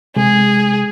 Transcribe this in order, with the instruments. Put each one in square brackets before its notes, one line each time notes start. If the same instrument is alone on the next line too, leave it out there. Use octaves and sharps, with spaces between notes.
[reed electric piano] C3 G#3 [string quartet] G#4